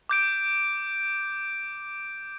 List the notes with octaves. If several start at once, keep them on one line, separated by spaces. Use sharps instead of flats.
D6 G6 D7